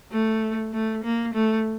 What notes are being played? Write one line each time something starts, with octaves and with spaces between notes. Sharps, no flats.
A3
A3
A#3
A3